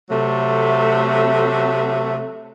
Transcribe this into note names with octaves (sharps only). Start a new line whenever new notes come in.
C3 F#3 A3